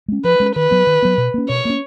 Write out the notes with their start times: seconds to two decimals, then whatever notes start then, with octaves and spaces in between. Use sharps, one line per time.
0.08 G#3 C#4
0.24 F3 B4
0.40 G#3 C#4
0.56 D#3 B4
0.71 F#3 B3
0.87 D#3
1.02 F#3 B3
1.18 B2
1.34 A#3 C#4
1.49 B2 C#5
1.65 A#3 C#4